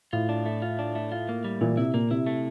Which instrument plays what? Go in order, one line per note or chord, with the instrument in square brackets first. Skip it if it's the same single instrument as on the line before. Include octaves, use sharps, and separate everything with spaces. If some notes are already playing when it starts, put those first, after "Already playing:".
[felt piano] A2 [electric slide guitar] F4
[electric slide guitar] D4
A3
F4
D4
A3
F4
A#3
G3
[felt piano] A#2 [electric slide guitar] E3
[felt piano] C3 [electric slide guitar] E4
[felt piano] A#2 [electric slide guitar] A#3
[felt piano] C3 [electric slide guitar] E4
[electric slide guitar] A3